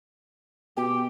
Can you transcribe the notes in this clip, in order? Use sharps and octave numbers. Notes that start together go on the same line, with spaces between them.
B2 G4 G5